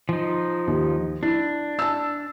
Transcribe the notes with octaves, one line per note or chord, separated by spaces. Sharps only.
F3 D#4
D#2
D4 E4
A5 E6